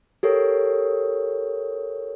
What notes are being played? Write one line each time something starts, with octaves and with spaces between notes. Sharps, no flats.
G4 A4 A#4 C#5